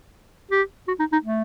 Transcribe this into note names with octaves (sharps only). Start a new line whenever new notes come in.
G4
F#4
D#4
D#4
A3